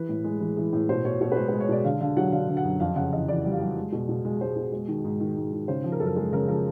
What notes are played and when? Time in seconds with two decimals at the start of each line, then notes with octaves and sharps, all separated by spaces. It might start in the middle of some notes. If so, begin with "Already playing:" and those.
Already playing: E3 B4
0.09 A2
0.24 G#3
0.40 E3
0.57 E3
0.73 A2
0.89 B2 C5
1.04 B2 C#5
1.21 B2 C#5
1.32 B4
1.36 G#3 C5
1.49 G#3 B4
1.60 C#5
1.69 B2 D5
1.85 D3 F5
2.01 D3 F5
2.17 F#3 F#5
2.32 D3 F5
2.49 D3
2.57 F#5
2.64 F#2
2.80 F2 F5
2.96 C#3 F#5
3.13 E3 D#5
3.28 E3 D5
3.45 G3
3.52 F5
3.61 G3
3.77 G#3
3.92 B2
4.09 B2
4.25 G#3
4.41 G#3 C5
4.56 B2
4.72 G#3
4.88 D#3
5.04 G#2
5.20 D#3
5.37 G#2
5.53 D#3
5.68 C#3 C5
5.84 F3
5.92 A#4
6.00 F#2 A4
6.06 A#4
6.16 G#3 A4
6.32 C#3 A#4
6.48 F3 A#4